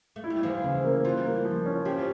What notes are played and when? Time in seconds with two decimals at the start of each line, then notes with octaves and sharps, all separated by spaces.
0.16 A3
0.24 E4
0.30 G3
0.43 D3 E3 F3
0.64 C#3
0.84 A#3
1.05 E3 G3 F4
1.25 A#3
1.45 F3
1.66 C#4
1.85 F3 A3 G4